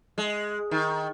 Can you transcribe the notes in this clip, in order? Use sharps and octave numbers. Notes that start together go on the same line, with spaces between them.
G#3
D#3